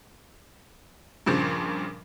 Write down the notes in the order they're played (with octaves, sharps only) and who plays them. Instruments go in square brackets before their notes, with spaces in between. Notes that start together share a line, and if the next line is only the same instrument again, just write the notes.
[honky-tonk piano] G2 A#2 C#3 F3